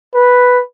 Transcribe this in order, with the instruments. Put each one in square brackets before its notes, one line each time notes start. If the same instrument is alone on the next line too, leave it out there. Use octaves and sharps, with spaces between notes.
[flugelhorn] B4